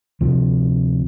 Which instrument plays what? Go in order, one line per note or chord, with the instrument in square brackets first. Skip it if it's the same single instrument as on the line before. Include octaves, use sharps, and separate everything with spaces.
[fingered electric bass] D2 C3 F3